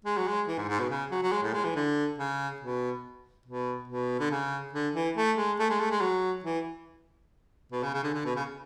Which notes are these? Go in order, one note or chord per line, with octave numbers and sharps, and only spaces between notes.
G#3
F#3
G#3
E3
G#2
G#2
B2
C#3
F#3
F#3
G#3
A2
G#3
E3
D3
C#3
B2
B2
B2
D3
C#3
D3
E3
A3
G#3
A3
G#3
A3
G#3
F#3
E3
B2
C#3
C#3
D3
D3
B2
C#3